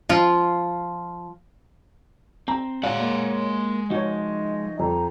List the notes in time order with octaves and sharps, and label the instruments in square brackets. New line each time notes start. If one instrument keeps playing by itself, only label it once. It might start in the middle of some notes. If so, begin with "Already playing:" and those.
[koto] F3 F4
[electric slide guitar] C4 [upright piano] A#5
[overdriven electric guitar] G#3 F#5 [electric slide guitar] F#4 D5 [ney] C#5 [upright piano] F5
[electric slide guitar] A#3 A#4
[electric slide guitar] F3 D#4 [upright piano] F#4 C#5 [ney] D#5
[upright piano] F2 [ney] A#5